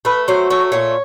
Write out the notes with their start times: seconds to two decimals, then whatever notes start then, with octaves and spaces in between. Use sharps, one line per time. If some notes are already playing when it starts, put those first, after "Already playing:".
0.05 A3 B4
0.28 F#3 C5
0.50 A3 C#5
0.72 A#2 C#5